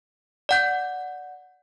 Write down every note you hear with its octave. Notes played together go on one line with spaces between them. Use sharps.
D5 F#5 G6